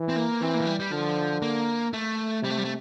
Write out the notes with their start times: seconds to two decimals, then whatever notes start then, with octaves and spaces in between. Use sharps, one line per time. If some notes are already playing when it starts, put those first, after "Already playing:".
Already playing: E3
0.08 C4
0.16 A#3
0.41 E3 C4
0.54 A#3
0.61 F3
0.66 G3
0.79 G3
0.91 D3 F3
1.42 A#3
1.93 A3
2.43 C3 G3
2.50 A3
2.58 G3
2.64 A3